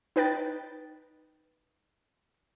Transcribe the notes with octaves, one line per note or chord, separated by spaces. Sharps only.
D#4 B4 G5 A6